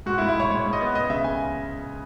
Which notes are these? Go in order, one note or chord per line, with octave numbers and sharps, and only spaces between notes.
G#2 F#4
E4
G#2
E4
G#2 C#5
G#2 C#5
G#2
D#5
B3
C#2 D#5
C#3 E5
C#3 G#5